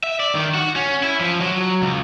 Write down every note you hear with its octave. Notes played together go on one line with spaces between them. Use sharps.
E5
D5
D#3
F#4
C#4
E4
F3
F#3
C#2